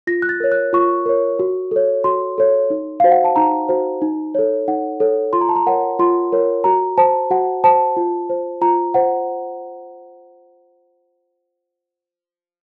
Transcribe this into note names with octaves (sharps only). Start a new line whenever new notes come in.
F4 A#6
F#6
A6
A#4 C#5
F#6
F4 C#6
A#4 C#5
F#4
A4 C#5
F#4 C6
A4 C#5
D#4
F#4 C5 F5
F#5
A5
D#4 A#5
F#4 C5
D#4
A4 C#5
D#4 F#5
A4 C#5
F4 C6
A#5
A5
A#5
A#4 C#5 F#5
F4 C6
A#4 C#5
F#4 A#5
C5 A5
F#4 F#5
C5 A5
F4
C5
F4 A#5
C5 F#5